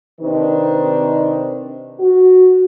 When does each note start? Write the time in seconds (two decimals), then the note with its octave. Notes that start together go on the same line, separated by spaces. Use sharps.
0.20 C3 D#3 D4 D#4 B4 C5
1.98 F#4